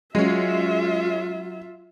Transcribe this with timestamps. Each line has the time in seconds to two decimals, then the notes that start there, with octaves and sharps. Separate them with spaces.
0.15 F#3 G#3 C#4 F4 E5